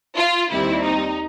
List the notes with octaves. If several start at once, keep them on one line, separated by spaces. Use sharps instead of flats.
F4
D#2 D#3 G3 C4 E4
D#4